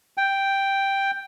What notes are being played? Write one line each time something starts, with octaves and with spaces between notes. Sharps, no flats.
G5